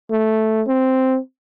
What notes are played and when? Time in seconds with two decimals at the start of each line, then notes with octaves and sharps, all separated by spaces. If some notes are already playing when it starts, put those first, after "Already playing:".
0.11 A3
0.67 C4